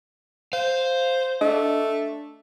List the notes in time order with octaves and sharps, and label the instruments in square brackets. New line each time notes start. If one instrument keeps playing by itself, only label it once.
[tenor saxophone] C5 [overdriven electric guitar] F5
[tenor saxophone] A3 [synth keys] D4 [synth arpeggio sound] D#5